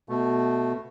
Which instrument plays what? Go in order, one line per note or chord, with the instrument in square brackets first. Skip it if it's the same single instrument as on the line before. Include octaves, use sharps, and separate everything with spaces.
[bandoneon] B2 A3